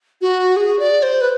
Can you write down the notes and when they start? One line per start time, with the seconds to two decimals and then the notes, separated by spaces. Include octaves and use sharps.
0.21 F#4
0.56 G#4
0.79 D5
1.03 C5
1.21 B4